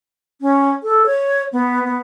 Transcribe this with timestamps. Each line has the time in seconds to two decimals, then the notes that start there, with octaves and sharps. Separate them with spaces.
0.42 C#4
0.83 A4
1.06 C#5
1.53 B3
1.84 B3